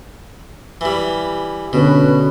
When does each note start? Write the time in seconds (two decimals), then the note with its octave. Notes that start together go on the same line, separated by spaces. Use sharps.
0.81 E3 G3
1.73 B2 D3 C#4 B4